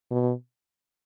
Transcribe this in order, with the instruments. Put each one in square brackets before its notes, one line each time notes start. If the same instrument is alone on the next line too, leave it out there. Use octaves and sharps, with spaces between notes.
[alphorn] B2